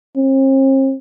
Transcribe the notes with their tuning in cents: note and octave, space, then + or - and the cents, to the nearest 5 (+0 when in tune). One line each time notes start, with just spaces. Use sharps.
C4 +40